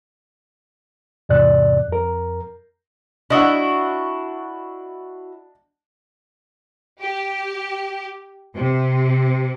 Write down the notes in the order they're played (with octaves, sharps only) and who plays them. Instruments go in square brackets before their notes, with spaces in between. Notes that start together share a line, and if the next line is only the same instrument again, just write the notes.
[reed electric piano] E2 G#2 C3 D5 F#6
F2 A#4
[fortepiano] D4 D#5 F#5 [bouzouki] E4 F#4
[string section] G4
C3